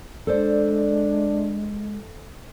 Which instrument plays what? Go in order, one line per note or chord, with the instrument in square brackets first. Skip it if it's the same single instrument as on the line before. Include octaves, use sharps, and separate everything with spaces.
[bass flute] G#3 [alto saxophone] D4 [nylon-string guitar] A4 C5 D5